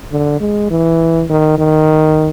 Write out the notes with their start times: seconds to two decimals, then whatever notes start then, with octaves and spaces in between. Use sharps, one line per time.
0.12 D3
0.40 G#3
0.71 E3
1.30 D#3
1.58 D#3